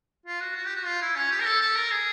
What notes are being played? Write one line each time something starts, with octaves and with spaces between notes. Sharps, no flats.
F4
F#4
F#4
G4
F#4
F4
E4
C#4
G4
A#4
A4
A4
A#4
G#4